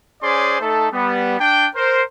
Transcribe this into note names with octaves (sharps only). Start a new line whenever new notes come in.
C#4 G#4 C5 D5 C6
A3 D#4 A4
G3 B3
D4 G5
A#4 C5